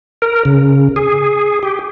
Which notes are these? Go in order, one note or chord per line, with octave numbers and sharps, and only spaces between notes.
A#4
C#3
G#4
G4